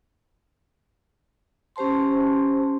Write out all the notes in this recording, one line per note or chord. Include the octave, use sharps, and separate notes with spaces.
C#4 G4 C5 A5 C6